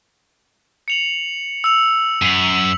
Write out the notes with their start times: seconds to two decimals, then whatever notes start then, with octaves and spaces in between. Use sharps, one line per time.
0.88 C#7 F7 F#7
1.64 E6 F7
2.22 F#2 B6 F7 F#7